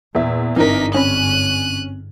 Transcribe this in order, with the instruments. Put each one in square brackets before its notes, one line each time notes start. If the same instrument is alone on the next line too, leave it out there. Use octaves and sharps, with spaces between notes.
[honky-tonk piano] E2 E5 [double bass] A#2
[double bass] G1 G#2 [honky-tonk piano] E3 D4 A#4 [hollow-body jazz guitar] C4 [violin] D#4 B6
[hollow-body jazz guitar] C4 B5 [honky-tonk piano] C#4 [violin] F#6 D#7